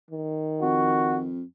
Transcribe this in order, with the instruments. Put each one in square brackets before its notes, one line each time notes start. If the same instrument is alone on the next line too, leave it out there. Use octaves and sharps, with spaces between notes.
[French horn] D#3
[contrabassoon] F2 [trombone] F#4